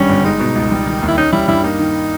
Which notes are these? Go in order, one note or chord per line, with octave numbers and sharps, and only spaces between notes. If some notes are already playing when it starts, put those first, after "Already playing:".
Already playing: G#1 G2 G3 C#4
G1
G#3 D#4
B2
C#2
G3
D#3
D#2
E4
C#4 D#4
G3 E4
G2 E4
A#3 D#4
D#3